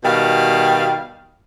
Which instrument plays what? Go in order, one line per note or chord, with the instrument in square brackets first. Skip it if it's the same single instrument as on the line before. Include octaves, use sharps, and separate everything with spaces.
[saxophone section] B2 D#3 G3 F5